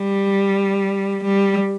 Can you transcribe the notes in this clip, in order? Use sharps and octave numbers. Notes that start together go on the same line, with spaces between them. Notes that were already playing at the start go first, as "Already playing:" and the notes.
Already playing: G3
G3